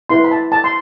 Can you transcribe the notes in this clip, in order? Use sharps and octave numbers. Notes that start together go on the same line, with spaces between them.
E4 B4 C6
B5
A5
A5
C6